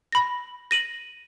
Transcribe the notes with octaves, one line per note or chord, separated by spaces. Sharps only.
B5 A#6
A#6 D#7 F#7